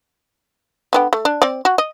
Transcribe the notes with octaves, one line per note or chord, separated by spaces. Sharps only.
D3 B3 G5
A3
D4
C4 D5
F#4
D#5